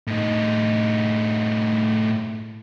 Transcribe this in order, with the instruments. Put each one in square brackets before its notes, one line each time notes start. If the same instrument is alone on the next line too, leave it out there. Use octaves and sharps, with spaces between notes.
[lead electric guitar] A2 D#4